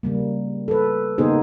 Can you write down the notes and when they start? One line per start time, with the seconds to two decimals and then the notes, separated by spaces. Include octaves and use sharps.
0.03 C#3 G3 A#3
0.68 A4 B4
1.18 C#3 A#3 B3 D#4 G#4 C5